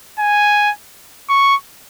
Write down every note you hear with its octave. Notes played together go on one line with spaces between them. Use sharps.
G#5
C#6